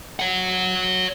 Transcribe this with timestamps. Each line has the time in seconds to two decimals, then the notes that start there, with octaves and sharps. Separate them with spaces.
0.20 C#5 F#5